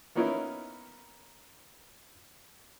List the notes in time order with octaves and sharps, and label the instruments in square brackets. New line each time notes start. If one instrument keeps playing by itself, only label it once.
[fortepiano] A#3 B3 C#4 D#4 E4